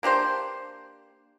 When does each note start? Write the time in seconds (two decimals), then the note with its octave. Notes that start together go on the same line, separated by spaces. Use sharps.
0.03 A#3 D4 G4 C5